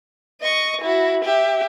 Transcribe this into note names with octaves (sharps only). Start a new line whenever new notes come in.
D#5 C#6
E4 F#4
G4 E5